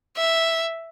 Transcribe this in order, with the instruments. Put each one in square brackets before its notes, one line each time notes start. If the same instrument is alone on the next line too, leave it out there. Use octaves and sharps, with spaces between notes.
[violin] E5